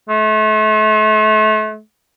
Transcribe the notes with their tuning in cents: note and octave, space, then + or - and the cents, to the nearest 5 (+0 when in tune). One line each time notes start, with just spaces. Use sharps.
A3 -35